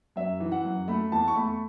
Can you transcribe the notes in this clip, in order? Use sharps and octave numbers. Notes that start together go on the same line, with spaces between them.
F#2 E5
E3
F#5
F#2
A3 B5
E2 A5
C#6
A3 B5